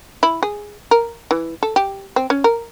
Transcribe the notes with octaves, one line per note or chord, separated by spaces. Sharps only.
E4
G#4
A#4
E3
A4
G4
C4
C#4
A#4